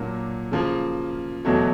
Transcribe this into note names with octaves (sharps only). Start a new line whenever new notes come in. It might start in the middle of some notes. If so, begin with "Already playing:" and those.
Already playing: A#2 F#3 A#3 D4
C#3 F3 A#3
E2 B2 F#3 A3